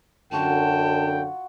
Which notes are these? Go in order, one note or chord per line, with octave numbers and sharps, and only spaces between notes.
F#2 D3 F4 F#4 F#5 G5 A5